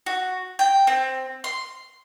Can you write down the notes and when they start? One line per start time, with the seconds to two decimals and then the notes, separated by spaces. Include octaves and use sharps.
0.06 F#4
0.59 G5
0.87 C4
1.44 C6